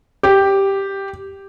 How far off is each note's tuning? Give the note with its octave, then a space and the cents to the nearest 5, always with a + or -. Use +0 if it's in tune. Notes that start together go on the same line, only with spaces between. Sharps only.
G4 +0